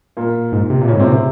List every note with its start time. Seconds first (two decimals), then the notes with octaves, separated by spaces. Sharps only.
0.17 A#2 A#3
0.52 G#2
0.70 C3
0.81 A#2
0.88 C#3 C#4
0.93 G#2
0.99 C3 C4
1.04 A#2
1.12 C3 C4